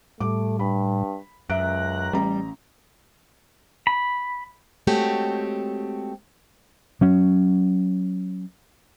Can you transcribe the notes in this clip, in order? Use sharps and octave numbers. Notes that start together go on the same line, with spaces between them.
A2 G3 A3 D6
G2 B5
C#2 F#2 E5 A#5 F#6 D7
A1 G3 A#5
B5
G#3 A3 C4 F#4 G4 C#5
F#3 C#4